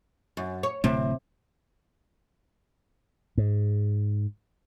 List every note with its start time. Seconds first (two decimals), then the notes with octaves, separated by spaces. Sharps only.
0.37 F#2
0.63 C#5
0.84 D1 A2 C3 C4
3.38 G#2